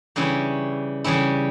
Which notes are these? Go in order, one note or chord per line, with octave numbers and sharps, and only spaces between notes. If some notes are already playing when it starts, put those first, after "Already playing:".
C#3 E3 G3 C#4 E4
C#3 E3 G3 C#4 E4